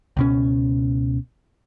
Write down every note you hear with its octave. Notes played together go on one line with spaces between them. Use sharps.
C#2 B2 C#4